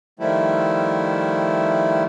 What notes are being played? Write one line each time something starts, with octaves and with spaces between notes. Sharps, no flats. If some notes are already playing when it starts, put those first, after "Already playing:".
D#3 F3 G3 A3 E4